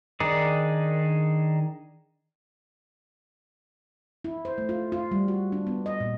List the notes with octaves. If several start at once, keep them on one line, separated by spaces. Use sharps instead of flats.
D#3 D4 D#4 G#4 D5
E4
C5
A3
F4
F4
G3
F#4
D4
B3
D#5
A#2